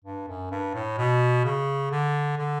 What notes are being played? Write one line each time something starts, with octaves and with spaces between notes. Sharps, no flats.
G2
F#2
G2
A2
B2
C#3
D3
D3